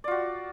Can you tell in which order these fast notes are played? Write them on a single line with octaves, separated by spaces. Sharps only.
D5 F4 F#4